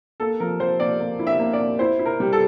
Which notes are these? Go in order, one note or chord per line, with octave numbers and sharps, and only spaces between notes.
A#3 A4
F3 A#4
F3 C5
A#3 D5
A#3
E4
E5
A#3
D5
A#3
E4 C5
E4
A#4
G3
A4